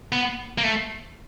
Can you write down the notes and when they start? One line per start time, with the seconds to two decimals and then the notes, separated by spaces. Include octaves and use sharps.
0.12 B3
0.58 A#3
0.63 A3